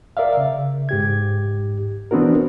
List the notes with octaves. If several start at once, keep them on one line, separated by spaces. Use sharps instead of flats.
A#4 D5 E5 F5
C#3
G#2 G4 G#6
E3 B3 C4 D4 F#4 A#4